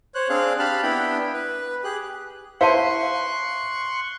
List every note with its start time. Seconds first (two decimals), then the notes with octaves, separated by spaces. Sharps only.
0.15 C5 C#5 F#6
0.29 C4 D4 G#4 F5 F#6
0.59 G4 F5 A5 B5 F6 F#6
0.83 B3 D4 E4 G5 B5
1.34 B4
1.84 G4 G#4 F#6
2.61 E4 C5 F5 A5 C6 C#6 F#6